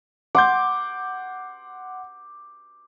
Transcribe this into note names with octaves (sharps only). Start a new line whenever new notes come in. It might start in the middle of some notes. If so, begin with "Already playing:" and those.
F#5 C6 D6 G6